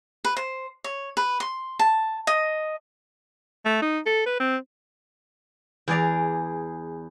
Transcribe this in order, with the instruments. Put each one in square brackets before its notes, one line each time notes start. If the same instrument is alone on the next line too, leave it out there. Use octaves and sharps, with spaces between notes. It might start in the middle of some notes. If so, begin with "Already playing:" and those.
[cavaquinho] B4
C5
C#5
B4
C6
A5
D#5
[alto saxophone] A3
D#4
A4
B4
C4
[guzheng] E2 G#4 D5 A#5